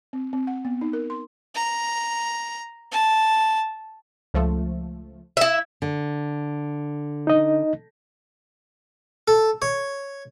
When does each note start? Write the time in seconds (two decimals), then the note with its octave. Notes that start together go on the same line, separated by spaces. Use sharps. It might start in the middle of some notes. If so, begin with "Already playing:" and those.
0.13 C4
0.33 C4
0.47 F#5
0.65 B3
0.81 D#4
0.93 A#4
1.10 C6
1.55 A#5
2.91 A5
4.34 C#2 F3 A3
5.37 E4 E5
5.82 D3
7.27 D#4 D#5
9.28 A4
9.62 C#5